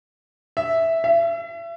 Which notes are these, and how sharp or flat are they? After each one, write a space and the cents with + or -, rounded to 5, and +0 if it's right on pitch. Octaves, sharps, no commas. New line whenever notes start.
E5 -5
E5 +35